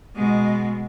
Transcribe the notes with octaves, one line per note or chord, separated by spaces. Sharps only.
B2 G#3